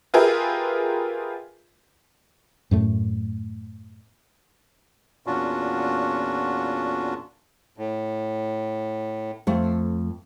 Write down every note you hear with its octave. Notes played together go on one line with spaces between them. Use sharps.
F4 G4 G#4 A#4 B4 E5
F#2 A2 A3
E2 A#2 C#4 D4 F4 F#4
A2
F2 A3